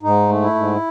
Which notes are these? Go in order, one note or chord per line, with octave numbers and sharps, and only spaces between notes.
G#2 D#4
A3
E4
G#2